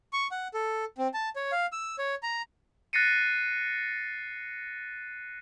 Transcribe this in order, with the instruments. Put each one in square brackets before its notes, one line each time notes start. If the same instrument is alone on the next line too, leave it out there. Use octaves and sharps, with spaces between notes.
[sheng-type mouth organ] C#6
F#5
A4
C4
A5
C#5
F5
E6
C#5
A#5
[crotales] F#6 A6 A#6 C7 C#7 D#7